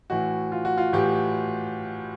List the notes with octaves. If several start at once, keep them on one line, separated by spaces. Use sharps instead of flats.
A2 E3 F#4
F4
F#4
F4
A2 E3 G4